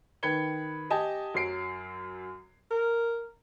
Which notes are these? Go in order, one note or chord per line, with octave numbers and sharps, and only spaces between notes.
D#3 B4 B5 G#6 C#7 G7
G4 D#5 G#5 A5
F#2 F#3 C7 D7
A#4